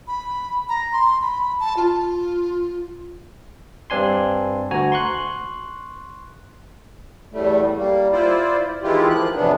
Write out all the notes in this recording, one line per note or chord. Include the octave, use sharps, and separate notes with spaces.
B5
A#5
C6
B5
A5
F4
G2 C4 D4 G#5 C6
D2 F#4 G#5 A#5
C6 C#6 F#6
E2 A2 G3 A3
G3 A#3
E4 F4 C5 D5
D#3 E3 G#3 E4 F4 G4
F3 A#3 F#6
F2 A2 C3 E3 B3 D4